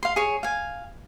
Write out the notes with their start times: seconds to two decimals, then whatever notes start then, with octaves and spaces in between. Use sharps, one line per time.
0.03 F5 C6
0.16 G#4 C#5
0.43 F5 G#5